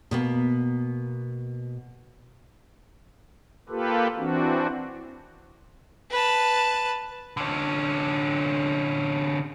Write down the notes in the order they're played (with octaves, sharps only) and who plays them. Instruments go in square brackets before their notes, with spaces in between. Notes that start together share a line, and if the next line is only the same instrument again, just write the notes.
[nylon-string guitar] B2 A#3 B3
[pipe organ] A#3 F4 G4 A4 B4
E3 C4 D4 F#4
[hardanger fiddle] B4 A5
[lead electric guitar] D3 C#4